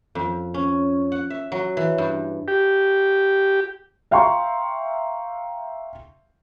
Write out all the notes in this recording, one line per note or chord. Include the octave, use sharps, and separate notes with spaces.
F2
C#4
F#5
E5
F#3
E3
G2
G4
E5 F5 G5 A#5 C6 C#6